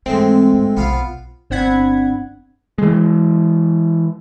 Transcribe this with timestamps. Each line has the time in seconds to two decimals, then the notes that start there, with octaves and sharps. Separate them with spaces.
0.06 G#2 E3 G#3 A3 C4
0.54 G#2
0.77 B1 B3 F4 F5
1.50 G1 C4 D4 F#5 B5 G#6
2.78 E3 G#3